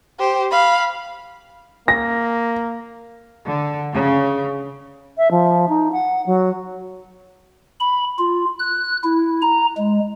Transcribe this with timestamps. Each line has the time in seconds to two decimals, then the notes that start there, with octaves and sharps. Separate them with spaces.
0.19 G4 C5
0.51 F5 B5
1.88 A#3 A#6
3.47 D3
3.93 C#3
5.18 E5
5.31 F3
5.69 D#4
5.92 F#5
6.26 F#3
7.80 B5
8.19 F4
8.59 F#6
9.04 E4
9.42 A#5
9.77 G#3